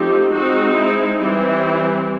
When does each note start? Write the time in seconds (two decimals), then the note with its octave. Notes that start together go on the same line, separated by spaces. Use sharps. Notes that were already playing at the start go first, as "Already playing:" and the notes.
Already playing: F3 A3 C4 D#4 G4
0.33 G#3 C4 D#4 F#4
0.77 E4
1.21 E3 G3 C4 E4